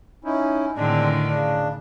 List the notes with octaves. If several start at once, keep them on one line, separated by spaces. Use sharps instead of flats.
C#4 D#4 E4
A2 D3 D#3 G#3 C4 D4
C#3 D4